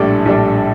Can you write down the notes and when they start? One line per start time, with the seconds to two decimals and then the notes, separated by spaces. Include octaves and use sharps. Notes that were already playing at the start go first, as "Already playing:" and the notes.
Already playing: A#1 A2 G3 D4 A4
0.25 A#1 A2 G3 D4 A4